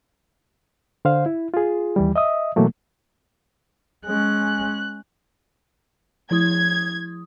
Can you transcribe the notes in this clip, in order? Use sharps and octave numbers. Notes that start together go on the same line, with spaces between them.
D3 C5 F5
E4
F4 G#4
D#2 E3 G3
D#5 E5 D#6
B2 E3 F#3 A3 A#3
G#3 C#4 F#6
F3 E4 D#6 G#6